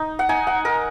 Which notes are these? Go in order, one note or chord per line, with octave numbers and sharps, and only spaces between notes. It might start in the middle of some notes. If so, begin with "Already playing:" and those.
Already playing: D#4
F#5
D#4 G#5
F#5
D#4 A#4